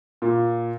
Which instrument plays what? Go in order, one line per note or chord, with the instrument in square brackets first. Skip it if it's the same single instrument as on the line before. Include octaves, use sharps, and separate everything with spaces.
[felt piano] A#2